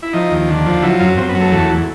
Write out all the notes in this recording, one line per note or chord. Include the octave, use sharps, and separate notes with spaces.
E4
F3 D#4
D#2
D3
F3
F#3 E4
F#2 F4
F#2 C4
B3
F#3
A3
E2 A3
E2